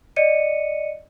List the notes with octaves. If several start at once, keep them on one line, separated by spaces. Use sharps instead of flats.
D5 D#5 C#7 D#7